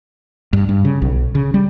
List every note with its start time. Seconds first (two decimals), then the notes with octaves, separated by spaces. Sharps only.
0.53 G2
0.69 G2
0.85 C#3
1.02 B1
1.35 C#3
1.54 G3